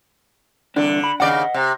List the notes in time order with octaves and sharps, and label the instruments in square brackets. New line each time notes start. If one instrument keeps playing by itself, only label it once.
[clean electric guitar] C2 E3 D4 [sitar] D3
[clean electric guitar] B5
[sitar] D#2 C#3 D5 [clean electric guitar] D#5 F#5
[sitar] C3